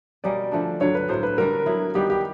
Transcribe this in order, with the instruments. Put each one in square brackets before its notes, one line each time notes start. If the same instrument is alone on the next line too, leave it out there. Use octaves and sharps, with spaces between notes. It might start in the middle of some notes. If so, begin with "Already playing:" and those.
[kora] B2 G3 A#3 C#4 [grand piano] D5
[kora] D3 F3 A3 D4
[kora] G2 D3 F#3 [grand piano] C#5
[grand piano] B4
[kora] A2 F#3 A#3 [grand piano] C5
[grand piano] B4
[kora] D3 G3 C4 [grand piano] A#4
[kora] F#3 B3 E4
[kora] D#3 G3 B3 [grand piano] G4
[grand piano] G4